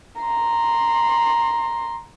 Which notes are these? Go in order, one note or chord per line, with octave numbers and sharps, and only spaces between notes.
A#5 C6